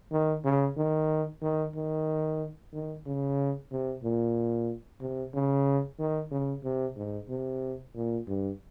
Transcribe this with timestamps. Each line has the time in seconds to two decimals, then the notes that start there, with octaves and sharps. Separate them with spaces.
0.12 D#3
0.45 C#3
0.78 D#3
1.42 D#3
1.76 D#3
2.73 D#3
3.06 C#3
3.71 C3
4.04 A#2
5.01 C3
5.35 C#3
5.99 D#3
6.31 C#3
6.64 C3
6.96 G#2
7.30 C3
7.95 A#2
8.28 G2